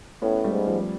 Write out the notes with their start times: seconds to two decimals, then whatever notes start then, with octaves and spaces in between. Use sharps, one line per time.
0.22 A2 B3 C#4
0.44 G3 A3
0.52 G#2
0.67 F3 G3